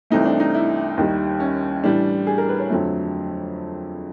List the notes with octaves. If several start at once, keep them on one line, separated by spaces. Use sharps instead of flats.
C2 C3 E3 A3 D#4
D4
D#4
E4
D#2 D#3 G3
C#4
A2 E3 G3 D4
G#4
A#4
B4
C#5
F2 D3 F#3 A3